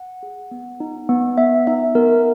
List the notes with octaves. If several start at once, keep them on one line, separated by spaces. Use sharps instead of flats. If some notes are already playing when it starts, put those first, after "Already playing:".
Already playing: F#5
G#4
B3
D#4
B3
B3 E5
D#4 E5
B3 A#4